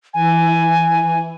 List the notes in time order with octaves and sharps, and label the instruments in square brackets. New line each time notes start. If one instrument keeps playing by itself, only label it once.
[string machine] E3 [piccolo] G#5